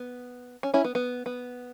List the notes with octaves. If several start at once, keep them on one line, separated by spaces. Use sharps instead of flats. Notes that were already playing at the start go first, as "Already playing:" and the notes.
Already playing: B3
C#4
C#4 E4
B3
B3
B3